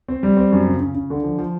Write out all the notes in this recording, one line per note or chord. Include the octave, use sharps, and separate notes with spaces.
C4
G3
C4
F#2
C#3
C#3
C#3
D3
F3
F3